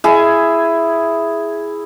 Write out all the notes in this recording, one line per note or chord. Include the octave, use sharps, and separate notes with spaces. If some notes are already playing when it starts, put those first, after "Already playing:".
E4 G#4 G#5